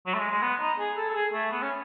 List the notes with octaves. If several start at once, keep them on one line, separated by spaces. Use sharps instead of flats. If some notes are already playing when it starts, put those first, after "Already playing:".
F#3
A3
G#3
G#3
B3
D#4
G#4
A4
A4
G#4
A3
B3
C#4